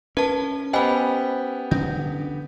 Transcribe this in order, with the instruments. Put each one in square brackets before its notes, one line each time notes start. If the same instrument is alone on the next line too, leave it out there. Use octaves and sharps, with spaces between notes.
[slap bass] C#4 [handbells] A#4 A5 [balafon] B4
[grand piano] B3 G4 [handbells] C5 G#5 [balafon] D#5 B5
[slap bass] D3 [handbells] C#4